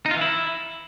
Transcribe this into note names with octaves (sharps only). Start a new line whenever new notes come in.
D#4
F4
E3
E4